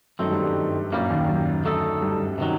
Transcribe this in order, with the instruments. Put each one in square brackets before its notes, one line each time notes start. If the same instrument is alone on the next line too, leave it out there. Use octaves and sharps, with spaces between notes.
[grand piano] F#2 F#3 [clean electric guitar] D#3 A3 C4
[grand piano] G2 G3
G2 G3
[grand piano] F#2 F#3 [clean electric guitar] A#2 G3 A#3
[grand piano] D#2 D#3
F#2 F#3
[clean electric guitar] D3 A3 D#4 A4
[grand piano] G2 G3
[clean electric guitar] C3 D#3 F#3